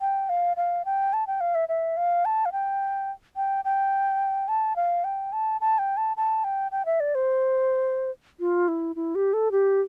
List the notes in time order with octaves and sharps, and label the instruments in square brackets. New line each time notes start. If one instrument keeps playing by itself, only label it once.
[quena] G5
F5
F5
G5
A5
G5
F5
E5
E5
F5
A5
F5
G5
G5
G5
A5
F5
G5
A5
A5
G5
A5
A5
G5
G5
E5
D5
C5
F4
E4
E4
G4
A4
G4